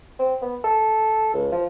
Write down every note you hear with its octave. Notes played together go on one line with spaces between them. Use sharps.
C4
B3
A4
C#2
F3